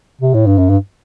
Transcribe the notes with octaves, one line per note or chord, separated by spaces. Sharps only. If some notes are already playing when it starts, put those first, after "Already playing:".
C3
A2
G2
F#2
G2